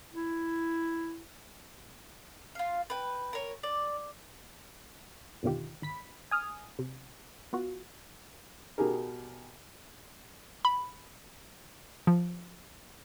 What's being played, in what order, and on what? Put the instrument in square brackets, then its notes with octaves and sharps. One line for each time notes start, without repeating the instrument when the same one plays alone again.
[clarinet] E4
[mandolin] F4 F5
B4 G5
A#4 C#5
D5
[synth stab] F2 B2 D3 D#3 F4 G4
G#1 B5 B6
G#5 D#6 F6
C3
B3 F4 F#4
[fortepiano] B2 G4 G#4 A#4
[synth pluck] B5
F3